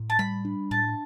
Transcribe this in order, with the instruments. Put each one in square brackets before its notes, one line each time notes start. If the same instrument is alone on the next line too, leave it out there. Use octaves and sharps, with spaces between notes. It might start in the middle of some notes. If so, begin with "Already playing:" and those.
Already playing: [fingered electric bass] A2
[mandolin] A5
[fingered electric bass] G3 [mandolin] B5
[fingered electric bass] D4
[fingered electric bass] A2 [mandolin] A5